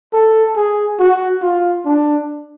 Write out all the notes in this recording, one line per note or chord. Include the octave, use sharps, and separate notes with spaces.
A4
G#4
F#4
F4
D4